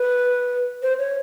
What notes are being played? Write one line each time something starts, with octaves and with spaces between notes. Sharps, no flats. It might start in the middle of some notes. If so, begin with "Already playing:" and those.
Already playing: B4
C5
C#5